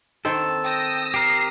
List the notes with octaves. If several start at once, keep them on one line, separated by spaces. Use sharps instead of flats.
D#3 C4 A4
G5 D#6 E6 A#6
G4 A#4 C7